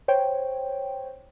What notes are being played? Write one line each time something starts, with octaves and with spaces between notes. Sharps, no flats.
C5 C#5 G5